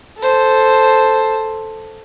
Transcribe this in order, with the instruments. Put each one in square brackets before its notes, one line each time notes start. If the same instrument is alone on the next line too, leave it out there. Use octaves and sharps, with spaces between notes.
[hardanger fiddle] A4 C5